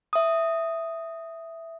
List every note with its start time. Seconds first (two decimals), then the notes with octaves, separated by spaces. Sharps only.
0.13 E5 D#6